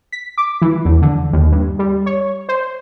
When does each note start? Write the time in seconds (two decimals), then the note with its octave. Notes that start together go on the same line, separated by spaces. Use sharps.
0.12 B6
0.38 D6
0.62 E3
0.85 E2
1.02 D3
1.33 D#2
1.52 G2
1.79 G3
2.06 C#5
2.49 C5